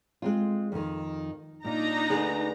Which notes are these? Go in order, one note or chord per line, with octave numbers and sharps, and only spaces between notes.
G#3 C4 F4
F2 D#3
A#2 D4 D#4 A#5
D2 G#4 B4